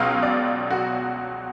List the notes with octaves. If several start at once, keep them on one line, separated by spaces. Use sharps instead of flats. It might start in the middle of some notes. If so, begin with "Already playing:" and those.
Already playing: C#2 B2 F#3 F5
D5
F#4